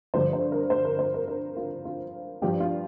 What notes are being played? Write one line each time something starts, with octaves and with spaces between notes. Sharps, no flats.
G2 D3 F3 C5
C5
A#4
C5
A#4
C5
A#4
A#4
F4
F4
G2 F3 G4
F4